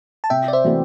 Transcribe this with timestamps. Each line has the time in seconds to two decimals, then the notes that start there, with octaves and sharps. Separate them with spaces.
0.24 A5
0.30 C3 E5 G5
0.48 D5
0.53 C5 E5
0.64 E3 A3 C4 F#4